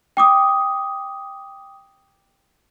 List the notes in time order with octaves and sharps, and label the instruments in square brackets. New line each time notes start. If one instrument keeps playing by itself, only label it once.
[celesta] G5 D6 D#6